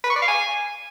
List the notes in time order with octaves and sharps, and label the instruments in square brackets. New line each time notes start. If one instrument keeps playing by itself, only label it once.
[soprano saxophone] B4
C#6
D5
F5
G#5